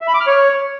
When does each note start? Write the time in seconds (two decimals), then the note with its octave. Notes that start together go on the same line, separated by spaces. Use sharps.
0.01 E5
0.08 B5
0.14 D6
0.20 F6
0.27 C#5